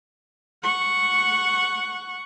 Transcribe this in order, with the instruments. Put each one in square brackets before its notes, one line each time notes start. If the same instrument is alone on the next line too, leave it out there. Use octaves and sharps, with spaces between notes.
[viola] F#5 C#6